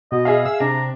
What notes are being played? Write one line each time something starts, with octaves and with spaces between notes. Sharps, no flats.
B2 D#5
G#4 E5 F5
E6
C3 D4 A#5